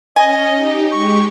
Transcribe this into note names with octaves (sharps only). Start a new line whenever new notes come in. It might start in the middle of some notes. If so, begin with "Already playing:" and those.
C#4 D#5 G#5
D#4 G4
G#3 G4 C#6